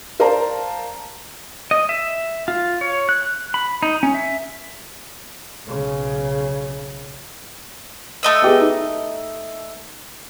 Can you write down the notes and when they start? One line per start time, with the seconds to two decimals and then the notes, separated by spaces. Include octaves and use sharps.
0.20 A#4 C5 D5 F5 A5 A#5
1.71 D#5
1.89 E5
2.48 F4
2.81 C#5
3.09 F#6
3.54 B5
3.83 D#4
4.03 C#4
4.15 E5
5.67 B1 C#3
8.23 A3 D#5 E6
8.42 B3 G4 G#4
8.61 D#4